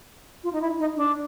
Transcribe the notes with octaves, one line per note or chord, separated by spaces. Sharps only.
F4
D#4
E4
D#4
D4